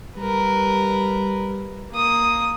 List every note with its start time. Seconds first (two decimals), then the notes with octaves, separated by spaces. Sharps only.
0.17 G3 A#4 B4
1.91 A#3 D#6